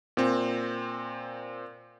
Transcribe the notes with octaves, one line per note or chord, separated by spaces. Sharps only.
A#2 C4